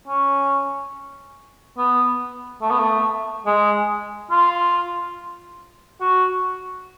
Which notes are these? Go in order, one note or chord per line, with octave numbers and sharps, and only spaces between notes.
C#4
B3
A3
B3
A3
G#3
F4
F#4